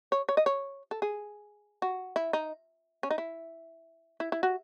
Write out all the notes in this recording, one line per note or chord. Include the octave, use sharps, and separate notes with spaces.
C#5
C#5
D#5
C#5
A4
G#4
F#4
E4
D#4
C#4
D#4
E4
E4
E4
F#4